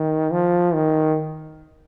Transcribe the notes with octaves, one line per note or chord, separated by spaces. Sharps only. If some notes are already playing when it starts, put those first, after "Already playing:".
Already playing: D#3
F3
D#3